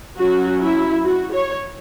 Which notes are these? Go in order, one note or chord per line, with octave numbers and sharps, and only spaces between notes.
F#3 C#4 F#4
E4
F#4
C#5